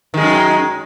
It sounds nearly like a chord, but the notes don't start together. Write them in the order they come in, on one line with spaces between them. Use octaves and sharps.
D#3 G#3 F#2